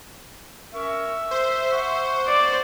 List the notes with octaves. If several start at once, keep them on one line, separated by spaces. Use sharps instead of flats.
C#4 A#4 E5 C#6
C5 C6
F#5 C#6
D5